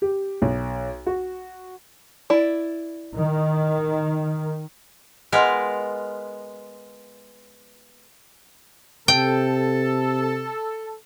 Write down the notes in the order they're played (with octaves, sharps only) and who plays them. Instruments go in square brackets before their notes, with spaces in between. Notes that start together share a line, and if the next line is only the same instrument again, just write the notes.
[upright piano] G4
B1
F#4
[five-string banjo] E4 D5
[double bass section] D#3
[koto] G#3 B3 F4 A#4
[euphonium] C3 [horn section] A4 [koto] G5